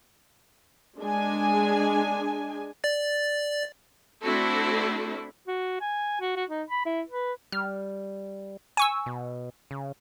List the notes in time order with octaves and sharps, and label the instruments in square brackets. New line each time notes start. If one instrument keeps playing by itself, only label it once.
[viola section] G#3 D4 G#5
[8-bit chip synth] D5 A6
[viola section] A3 C4 D4 E4 F#4 A4
[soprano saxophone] F#4
G#5
F#4
F#4
D#4
B5
E4
B4
[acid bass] G3 [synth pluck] F6
[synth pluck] G#5 C#6 E6
[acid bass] B2
C#3